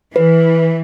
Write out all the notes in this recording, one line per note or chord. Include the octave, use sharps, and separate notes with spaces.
E3 B4